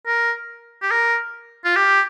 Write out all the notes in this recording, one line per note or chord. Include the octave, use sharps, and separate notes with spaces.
A#4
G4
A#4
F4
G4